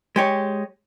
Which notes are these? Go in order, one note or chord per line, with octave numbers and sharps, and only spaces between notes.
G#3 G4 C#5